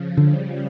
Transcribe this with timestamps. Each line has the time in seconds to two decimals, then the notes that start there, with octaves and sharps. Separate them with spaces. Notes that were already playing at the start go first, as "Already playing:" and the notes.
Already playing: C#3 F3
0.17 D3 G3